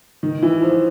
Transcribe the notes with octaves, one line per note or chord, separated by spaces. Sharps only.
D#3
E3
F3